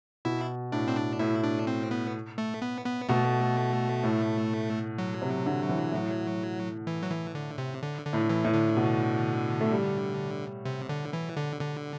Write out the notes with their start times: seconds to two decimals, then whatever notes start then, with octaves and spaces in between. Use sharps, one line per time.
0.25 B2 E4
0.72 A2 D4
0.88 C4
0.97 D4
1.19 A2 E4
1.43 D4
1.67 C4
1.91 B3
2.38 A3
2.62 B3
2.85 B3
3.09 B2 A3
4.03 A2
4.98 F#3
5.22 C3
5.46 D3
5.69 E3
5.92 A2
6.87 E3
7.03 F#3
7.11 E3
7.35 D3
7.58 C3
7.83 D3
8.06 D3
8.13 A2
8.29 E3
8.45 A2
8.53 D3
8.77 B2
9.61 A3
9.72 G3
10.65 C3
10.89 D3
11.13 E3
11.36 D3
11.61 D3